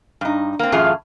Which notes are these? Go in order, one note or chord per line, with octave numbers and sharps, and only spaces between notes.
G2 D#4
A#3 C4
F#2 A2 E3 F4 G#4 F5